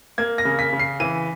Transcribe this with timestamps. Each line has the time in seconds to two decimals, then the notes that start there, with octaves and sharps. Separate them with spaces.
0.18 A#3 G#6
0.38 A#6
0.45 C#3
0.59 B6
0.73 C#3
0.79 C7
1.00 E3 D#7